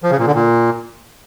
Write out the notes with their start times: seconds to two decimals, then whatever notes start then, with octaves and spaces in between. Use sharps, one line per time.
0.03 F3
0.11 C#3
0.19 A#2
0.27 D3
0.35 A#2